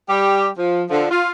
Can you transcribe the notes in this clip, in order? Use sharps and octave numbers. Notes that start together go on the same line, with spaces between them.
G3 G4
F3
D3 F3
F4